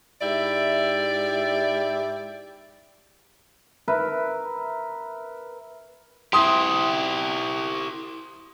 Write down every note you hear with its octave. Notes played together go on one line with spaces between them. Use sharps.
G#2 E4 G4 D5 E5
A#4 B4 E5
E4 G4 C6 D#6